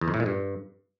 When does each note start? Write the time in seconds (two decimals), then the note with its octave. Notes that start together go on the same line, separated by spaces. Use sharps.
0.01 E2
0.08 F2
0.14 A2
0.20 A#2
0.26 G2